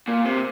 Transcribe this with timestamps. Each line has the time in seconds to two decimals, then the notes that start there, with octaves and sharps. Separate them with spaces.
0.08 A#2
0.25 C3